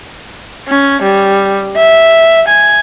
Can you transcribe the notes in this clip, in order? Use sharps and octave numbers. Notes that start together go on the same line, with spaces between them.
C#4
G3
E5
G#5